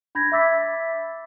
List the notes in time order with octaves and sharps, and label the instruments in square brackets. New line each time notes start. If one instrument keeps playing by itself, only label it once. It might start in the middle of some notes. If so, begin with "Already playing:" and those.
[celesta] D4 B5 G6 G#6 A#6
E5 B5 D6 E6 A6 B6